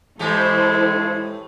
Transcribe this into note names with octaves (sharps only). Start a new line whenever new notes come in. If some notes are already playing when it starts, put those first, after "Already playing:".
A2 E3 G#3 E4 G4 A4 C5